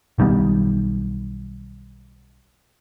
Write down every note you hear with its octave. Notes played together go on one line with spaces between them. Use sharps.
B1 D#3 G3 B3